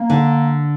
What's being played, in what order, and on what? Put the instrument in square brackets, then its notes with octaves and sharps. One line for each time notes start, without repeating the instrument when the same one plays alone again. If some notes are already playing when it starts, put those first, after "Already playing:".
Already playing: [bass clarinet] A#3
[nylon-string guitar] D3